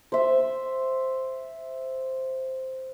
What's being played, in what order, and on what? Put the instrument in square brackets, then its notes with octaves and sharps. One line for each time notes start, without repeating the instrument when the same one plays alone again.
[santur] C5 E5